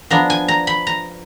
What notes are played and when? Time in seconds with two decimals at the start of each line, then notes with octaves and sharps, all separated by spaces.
0.10 F3 B3 D4 A#5
0.30 G#5
0.48 A#5
0.67 B5
0.87 A#5